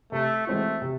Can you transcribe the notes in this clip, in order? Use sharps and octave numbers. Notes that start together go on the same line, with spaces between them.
C3 A3
E3 G#3 A3 C4 F#4
C3